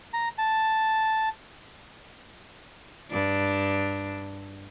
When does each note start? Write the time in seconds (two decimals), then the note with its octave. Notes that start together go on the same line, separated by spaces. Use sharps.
0.14 A#5
0.38 A5
3.11 G2 D4